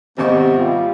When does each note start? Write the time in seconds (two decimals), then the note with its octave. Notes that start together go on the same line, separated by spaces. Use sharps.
0.18 G#1 C3 A#3 B3 D#5 C#6
0.56 G3 F4